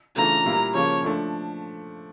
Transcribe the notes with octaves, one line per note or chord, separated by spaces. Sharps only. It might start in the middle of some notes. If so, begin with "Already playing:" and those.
C#3 E3 A3 D4 F4 A#5
A#2 G3 A#3 E4
C#3 F3 A#3 C#5
F3 A3 D4